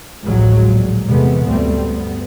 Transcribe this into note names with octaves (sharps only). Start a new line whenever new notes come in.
A1 D2 A2 F3 F#3 G#3
A#2
E2 C3 G#3 A3 B3
D2 G2 G3 A3 C4
B3